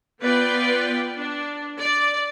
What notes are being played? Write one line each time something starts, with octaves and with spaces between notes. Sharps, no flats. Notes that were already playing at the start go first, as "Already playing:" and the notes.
B3 F4 B4 D5 G5
D4
D5